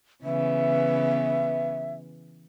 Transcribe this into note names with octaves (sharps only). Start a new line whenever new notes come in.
C#3 E3 B3 E5